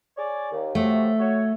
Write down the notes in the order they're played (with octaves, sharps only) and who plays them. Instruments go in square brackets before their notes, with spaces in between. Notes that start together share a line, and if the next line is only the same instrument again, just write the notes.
[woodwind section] G#4 C#5 D5
D#2
[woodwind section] C3 F3 F#3 [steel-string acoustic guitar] A3
[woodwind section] F#4 C#5